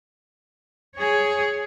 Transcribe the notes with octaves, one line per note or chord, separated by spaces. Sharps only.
G#4 C#5